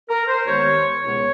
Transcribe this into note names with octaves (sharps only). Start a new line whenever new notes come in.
A#4
C5
D#2 D#3 G#3 B3 C#5
C#2 B2 G#3 B3 C#5